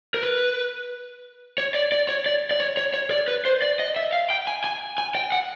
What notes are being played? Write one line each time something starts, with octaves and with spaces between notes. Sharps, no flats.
A#4
B4
C#5
D5
D5
C#5
D5
D5
C#5
C#5
C#5
D5
B4
C5
D5
D#5
E5
F5
G5
G#5
G#5
G#5
G5
F#5